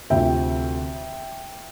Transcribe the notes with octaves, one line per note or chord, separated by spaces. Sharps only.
D2 C3 F3 E5 G5